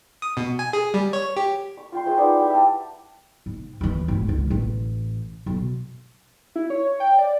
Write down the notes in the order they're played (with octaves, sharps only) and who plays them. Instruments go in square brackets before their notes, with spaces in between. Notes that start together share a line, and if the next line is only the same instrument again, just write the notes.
[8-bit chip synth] D#6
B2
G#5
G#4
G3
C#5
G4
[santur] C#6
F4 G5 C6
F4 G#4 C5 E5
D#4 B4 D5 F#5
E4 G4 G5
E5 A5
[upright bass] G#2
D#2 E3
G#1 A2
C#2 D#3
A1
B1
[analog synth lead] E4
C#5
G5
D5